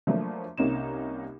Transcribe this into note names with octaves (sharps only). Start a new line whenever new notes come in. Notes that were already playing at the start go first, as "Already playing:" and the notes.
F3 F#3 A3 A#3 D4
C2 A#3 C#4 D#4 E7